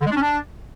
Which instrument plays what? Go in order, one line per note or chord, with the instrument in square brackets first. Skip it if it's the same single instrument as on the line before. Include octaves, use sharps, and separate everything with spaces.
[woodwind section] D3
G#3
D4
C#4
D4